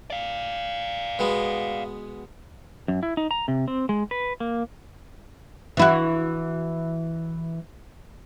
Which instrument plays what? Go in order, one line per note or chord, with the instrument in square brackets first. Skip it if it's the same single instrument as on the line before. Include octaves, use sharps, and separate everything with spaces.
[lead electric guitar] D5 F5
[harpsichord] B2 G#3 B3
[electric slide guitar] F#2
E4
D#4
A#5
C3
C4
G#3
B4
A#3
[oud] E3 E4 F#4